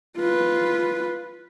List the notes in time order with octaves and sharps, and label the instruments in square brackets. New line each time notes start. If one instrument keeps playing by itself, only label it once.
[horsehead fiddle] F4 B4